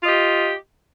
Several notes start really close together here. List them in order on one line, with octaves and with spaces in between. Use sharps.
F4 D#5 G4